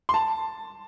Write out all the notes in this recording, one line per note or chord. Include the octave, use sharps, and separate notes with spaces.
C6
A5